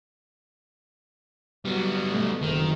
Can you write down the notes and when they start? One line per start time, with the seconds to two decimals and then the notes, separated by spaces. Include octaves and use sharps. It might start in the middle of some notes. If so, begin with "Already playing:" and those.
1.65 F#3 G3 B3
2.10 B2 A3
2.43 F#1 D#3